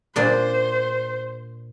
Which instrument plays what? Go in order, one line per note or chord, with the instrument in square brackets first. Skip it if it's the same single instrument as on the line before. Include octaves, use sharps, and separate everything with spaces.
[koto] A#2 D4 D5 [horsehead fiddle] C5